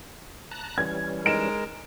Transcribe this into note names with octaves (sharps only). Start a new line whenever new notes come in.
A5 A#5 F#6
E3 G3 C#4 G#6
G#3 D#4 A#4 D7 E7